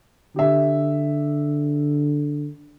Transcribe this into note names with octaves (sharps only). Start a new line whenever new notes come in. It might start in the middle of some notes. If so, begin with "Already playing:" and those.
D3 G4 E5